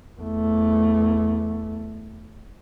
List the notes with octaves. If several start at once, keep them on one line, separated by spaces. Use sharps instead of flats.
E2 A3